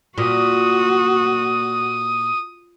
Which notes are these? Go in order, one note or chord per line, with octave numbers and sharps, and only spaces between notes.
A#2 F#4 D#6